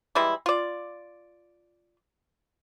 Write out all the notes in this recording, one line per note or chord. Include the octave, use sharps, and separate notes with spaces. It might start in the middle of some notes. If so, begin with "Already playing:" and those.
E3 G3 G#3 E4
F4 D5